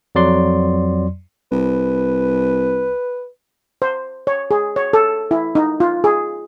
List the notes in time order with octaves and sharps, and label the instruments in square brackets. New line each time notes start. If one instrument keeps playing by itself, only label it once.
[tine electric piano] F2 F#3 D5 C6
[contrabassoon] C2 [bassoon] B4
[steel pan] C5
C#5
G#4
C#5
A4
E4
D#4
F4
G#4